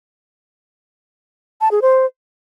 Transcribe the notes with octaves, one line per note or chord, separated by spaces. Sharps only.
A5
G#4
C5